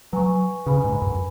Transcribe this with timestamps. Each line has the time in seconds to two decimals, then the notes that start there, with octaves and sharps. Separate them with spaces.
0.13 F#3 B4 G#5 C#6
0.66 C#3 B4 G#5 B5
0.84 G#2
1.02 F#2